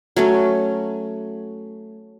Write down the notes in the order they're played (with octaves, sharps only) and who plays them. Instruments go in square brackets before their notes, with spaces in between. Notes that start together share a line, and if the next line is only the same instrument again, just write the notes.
[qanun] F#3 A3 C#4